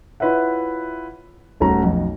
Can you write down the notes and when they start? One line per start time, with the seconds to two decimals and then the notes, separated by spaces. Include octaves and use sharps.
0.20 E4 F4 B4 C#5 E5 F#5
1.60 D#1 A3 C#4 F#4 F#5 A#5
1.83 B1 F2